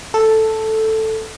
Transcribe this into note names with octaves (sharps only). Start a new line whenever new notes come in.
A4